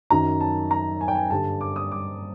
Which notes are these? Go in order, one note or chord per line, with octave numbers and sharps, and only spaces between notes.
F#2 D#3 F#3 A#5
A5
A#5
G#5
G5
G#5
G2 D3 G3 A5
D6
D#6
D6